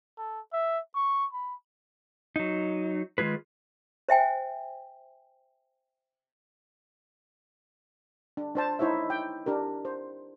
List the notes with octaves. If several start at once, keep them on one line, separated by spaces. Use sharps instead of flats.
A4
E5
C#6
B5
F#3 D#4
D#3 G#3 F4 G#4 B4
C5 E5 G5 G#5
D4
D4 C5 A5
D#4 E4 C5 C#5 E5
G5
D4 G4 A#4
C5